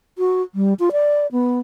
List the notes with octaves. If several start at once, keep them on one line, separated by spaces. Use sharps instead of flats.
F#4
G3
F4
D5
B3